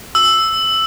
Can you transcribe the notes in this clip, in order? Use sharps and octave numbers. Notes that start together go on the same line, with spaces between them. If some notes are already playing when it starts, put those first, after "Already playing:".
E6